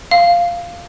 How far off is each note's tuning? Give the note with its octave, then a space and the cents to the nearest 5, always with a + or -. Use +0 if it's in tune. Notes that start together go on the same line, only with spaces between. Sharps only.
F5 -5